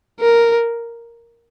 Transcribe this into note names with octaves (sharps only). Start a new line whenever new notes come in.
A#4